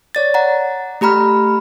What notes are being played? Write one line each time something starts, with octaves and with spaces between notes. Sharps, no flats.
C#5 D5 A6
F#5 A#5
A3 G4 A#5 B5 F6